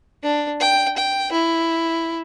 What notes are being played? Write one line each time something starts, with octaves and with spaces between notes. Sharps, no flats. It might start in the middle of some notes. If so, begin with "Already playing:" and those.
D4
G5
G5
E4